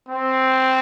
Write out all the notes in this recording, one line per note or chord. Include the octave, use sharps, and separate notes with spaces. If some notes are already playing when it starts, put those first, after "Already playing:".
C4